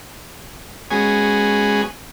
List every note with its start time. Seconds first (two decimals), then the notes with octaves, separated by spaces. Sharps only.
0.91 G#3 B3 C#4 F#4 G#4 G#5